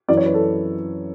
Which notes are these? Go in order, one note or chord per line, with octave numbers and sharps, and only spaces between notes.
F#2 E3 D5
C#5
B4
A4